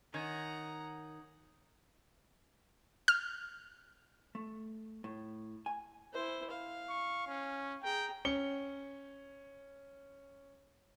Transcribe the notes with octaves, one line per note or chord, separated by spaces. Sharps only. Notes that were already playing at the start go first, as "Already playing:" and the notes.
D#3 D#4 C#5 F#5 G#5 A#5
F6
A3
A2
G#5
E4 C5
F5
C#6
C#4
G#4 G5 A#5
C#4 C#7 G7